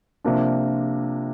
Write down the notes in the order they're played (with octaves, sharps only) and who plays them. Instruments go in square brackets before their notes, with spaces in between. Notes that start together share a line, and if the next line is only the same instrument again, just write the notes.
[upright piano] C3 F3 A#3 D4